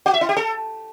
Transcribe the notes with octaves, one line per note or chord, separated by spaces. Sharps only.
F#4
E5
E4
G4
A4